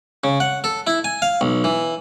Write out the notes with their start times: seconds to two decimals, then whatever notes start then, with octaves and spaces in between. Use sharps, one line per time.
0.24 C#3
0.40 F#5
0.64 A4
0.87 E4
1.04 G#5
1.22 F5
1.41 B1
1.64 E3